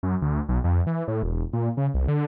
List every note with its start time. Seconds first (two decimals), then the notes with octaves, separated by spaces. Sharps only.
0.03 F#2
0.22 D2
0.49 B1
0.64 F2
0.87 E3
1.08 A2
1.23 E1
1.53 A#2
1.77 C#3
1.94 C2
2.08 D3